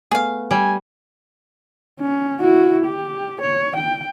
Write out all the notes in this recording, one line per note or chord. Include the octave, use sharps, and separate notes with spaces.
A3 B3 G#4 F5
G3 G#5
C#4
E4 F#4
G4
C#5
G5